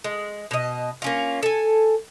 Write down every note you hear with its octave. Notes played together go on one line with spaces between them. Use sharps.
G#3
B2 D#5
A#3 C#4 F4
A4 G#5